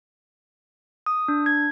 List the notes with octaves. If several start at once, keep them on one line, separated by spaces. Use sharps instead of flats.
D#6
D4
G#6